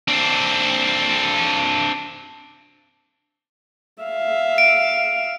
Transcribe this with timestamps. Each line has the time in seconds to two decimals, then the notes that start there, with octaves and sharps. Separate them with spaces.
0.08 C4 D4
4.02 E5 F5
4.58 D7